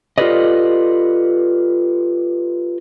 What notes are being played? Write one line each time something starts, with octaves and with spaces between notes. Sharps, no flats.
F4 G4 A4 B4 D5 D#5